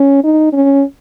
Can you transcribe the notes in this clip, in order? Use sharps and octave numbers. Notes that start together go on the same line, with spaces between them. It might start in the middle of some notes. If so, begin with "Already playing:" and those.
Already playing: C#4
D#4
C#4